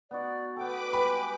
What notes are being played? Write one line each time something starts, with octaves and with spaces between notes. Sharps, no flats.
B3 D#4 F#4 D5
B3 A4 B4 G5 D6
G3 G#3 G5 B5